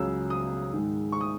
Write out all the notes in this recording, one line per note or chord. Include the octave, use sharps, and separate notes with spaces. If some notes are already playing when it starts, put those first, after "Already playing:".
Already playing: C#2 C#3 F#3 E6
D#6
G#2 D#3 G#3
C#6
D#6